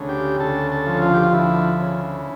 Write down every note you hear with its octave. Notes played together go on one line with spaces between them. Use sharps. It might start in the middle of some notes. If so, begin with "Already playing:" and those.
Already playing: D2 C#3
G4
D2 A4
A4
F3
F4
G4
F4
D2 E4
C#3